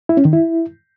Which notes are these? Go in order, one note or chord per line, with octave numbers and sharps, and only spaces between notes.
E4
C#4
D#3
E4